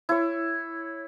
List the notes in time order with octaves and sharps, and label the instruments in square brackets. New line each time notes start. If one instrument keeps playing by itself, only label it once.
[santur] E4 C#5